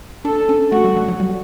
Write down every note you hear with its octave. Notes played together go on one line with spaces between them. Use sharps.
D4 A4
C#4
A3 F#4
G3
F#3
F#3
G3